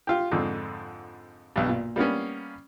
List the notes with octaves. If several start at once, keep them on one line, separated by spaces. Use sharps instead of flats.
F4 G4
F2 G#2 D3
B1 G2
A#2
G3 A#3 B3 C#4